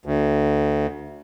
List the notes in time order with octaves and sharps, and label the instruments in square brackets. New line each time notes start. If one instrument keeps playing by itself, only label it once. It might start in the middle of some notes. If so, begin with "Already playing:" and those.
[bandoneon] D2